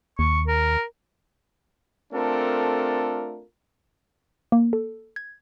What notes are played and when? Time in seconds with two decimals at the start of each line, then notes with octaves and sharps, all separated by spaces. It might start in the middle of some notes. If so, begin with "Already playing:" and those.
0.19 D#2 C#6
0.48 A#4
2.12 A3 C4 D4 F4 A4 A#4
4.52 A#3
4.73 A4
5.16 G#6